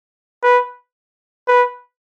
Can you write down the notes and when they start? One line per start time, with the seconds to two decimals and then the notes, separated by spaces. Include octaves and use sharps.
0.43 B4
1.48 B4